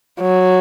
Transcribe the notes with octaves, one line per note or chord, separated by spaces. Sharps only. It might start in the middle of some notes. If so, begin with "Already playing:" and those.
F#3